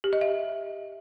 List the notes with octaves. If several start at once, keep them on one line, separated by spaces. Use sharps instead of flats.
G4
D#5
E5